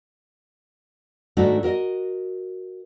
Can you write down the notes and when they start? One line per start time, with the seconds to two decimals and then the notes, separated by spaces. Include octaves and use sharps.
1.37 G#2 D#3 A3 D4 D#4 F#4
1.63 F#4 A#4 D#5